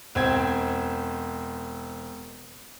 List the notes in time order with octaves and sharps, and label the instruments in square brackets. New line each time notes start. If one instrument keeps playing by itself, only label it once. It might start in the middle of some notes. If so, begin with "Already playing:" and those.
[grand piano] E1 C4 G5 G#6